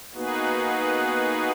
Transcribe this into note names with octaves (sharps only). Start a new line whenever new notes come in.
A#3 B3 D#4 F#4 G#4 B4